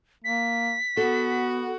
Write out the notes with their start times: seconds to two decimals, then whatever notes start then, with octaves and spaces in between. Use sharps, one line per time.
0.24 A#3 B6
0.97 B3 F#4 A4